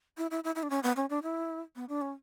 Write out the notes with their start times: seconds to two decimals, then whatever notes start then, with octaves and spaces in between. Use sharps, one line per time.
0.18 E4
0.31 E4
0.44 E4
0.55 E4
0.63 D4
0.70 C#4
0.83 B3
0.96 C#4
1.10 D4
1.23 E4
1.76 B3
1.89 D4
2.01 C#4